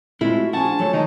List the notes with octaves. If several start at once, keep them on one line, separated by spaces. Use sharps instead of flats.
G#3 A3 C4 E4 F4
F#4
F3 C#4 F#4 G#4 A5
D4
F#3 A3 C#5
D#3 G#3 A3 D#4